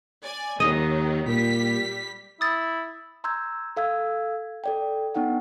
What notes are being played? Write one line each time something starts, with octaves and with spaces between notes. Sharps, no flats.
D5 G#5
D#2 D#3 F#3 D#5
A#2 G3 B6
E4 D#6 A6
A#5 C6 E6 G6 G#6
A4 F5 E6 G#6
A4 D5 G5
B3 D4 D#4 F#5 G5